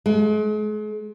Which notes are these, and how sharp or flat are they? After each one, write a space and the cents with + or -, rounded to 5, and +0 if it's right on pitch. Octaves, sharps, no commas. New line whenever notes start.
G#3 +40